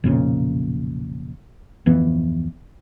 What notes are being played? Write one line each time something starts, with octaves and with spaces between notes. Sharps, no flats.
B1 F2 A#2 C#3
D1 F2 E3 B3